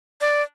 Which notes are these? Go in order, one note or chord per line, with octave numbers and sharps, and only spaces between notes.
D5